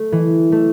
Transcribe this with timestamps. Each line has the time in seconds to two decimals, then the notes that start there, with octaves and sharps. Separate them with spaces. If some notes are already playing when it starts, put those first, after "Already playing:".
Already playing: A3
0.12 E3
0.52 A3